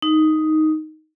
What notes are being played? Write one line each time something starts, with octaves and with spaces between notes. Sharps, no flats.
D#4